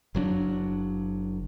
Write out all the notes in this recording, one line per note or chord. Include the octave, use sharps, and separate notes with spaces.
F#1 F#3 C#4 D4